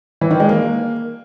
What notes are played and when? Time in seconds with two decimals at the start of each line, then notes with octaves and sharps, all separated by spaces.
0.21 E3
0.31 D#3
0.40 G#3
0.49 A#3